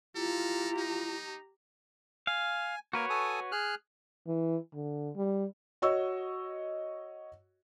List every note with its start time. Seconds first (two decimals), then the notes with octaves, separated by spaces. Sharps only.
0.16 E4 F4 G4 A4 A#5
0.77 D#4
2.27 F5 G#5
2.93 A#3 F#4 A#4 B4 C#5
3.10 A4 G#5 D#6
3.52 G#4 F6 F#6
4.27 E3
4.74 D3
5.16 G3
5.82 F#4 C#5 D#5 C#6 E6